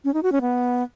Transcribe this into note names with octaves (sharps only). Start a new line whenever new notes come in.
C#4
D#4
F#4
C#4
B3